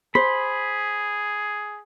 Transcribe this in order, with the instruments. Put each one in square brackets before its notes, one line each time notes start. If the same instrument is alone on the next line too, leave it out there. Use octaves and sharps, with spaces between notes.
[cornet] G#4 [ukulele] C5 [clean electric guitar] B5